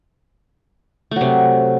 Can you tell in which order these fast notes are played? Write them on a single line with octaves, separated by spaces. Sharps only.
A3 F#3 C3